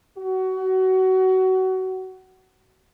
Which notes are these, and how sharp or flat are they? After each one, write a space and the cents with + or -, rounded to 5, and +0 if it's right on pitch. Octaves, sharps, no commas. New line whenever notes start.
F#4 +25